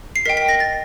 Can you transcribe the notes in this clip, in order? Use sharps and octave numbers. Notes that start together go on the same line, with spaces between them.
C7
A#4 D#5 G5 B6
B6
A#6
A6